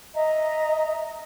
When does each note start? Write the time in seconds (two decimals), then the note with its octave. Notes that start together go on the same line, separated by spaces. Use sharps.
0.14 D#5 E5 A#5